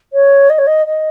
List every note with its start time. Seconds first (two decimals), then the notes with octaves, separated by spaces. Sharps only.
0.13 C#5
0.49 D#5
0.58 C#5
0.67 D#5
0.86 D#5